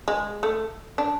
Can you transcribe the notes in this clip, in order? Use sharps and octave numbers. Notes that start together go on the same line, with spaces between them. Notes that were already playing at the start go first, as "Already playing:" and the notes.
G#3
A3
D4